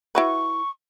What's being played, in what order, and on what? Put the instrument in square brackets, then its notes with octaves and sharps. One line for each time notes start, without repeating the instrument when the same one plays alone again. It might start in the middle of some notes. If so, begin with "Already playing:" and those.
[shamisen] E4 F#4 B4 [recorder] C#6